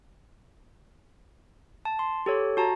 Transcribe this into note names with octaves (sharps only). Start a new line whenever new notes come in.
A5
C6
G4 A4 C#5
F#4 A5 A#5